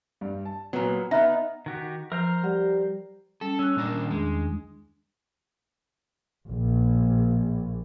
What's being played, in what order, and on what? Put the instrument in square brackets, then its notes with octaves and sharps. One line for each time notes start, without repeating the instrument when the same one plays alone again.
[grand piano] G2 G3
A5
[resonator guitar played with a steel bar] A#2 F#3 [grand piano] B3
[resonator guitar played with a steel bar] B3 D#4 [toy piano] E5 [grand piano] B5 F6 F#6
[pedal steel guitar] D#3 F#4 G4
[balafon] F3 [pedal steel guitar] A#4 C5 A#5
[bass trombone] G3 [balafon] F#5
[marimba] G3 C#4 [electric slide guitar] A4
[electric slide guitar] C#4 [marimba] E6 F#6
[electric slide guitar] A#2 D4 A#4
[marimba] D#3
[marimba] E2 D4 [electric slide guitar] G#3
[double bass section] A#1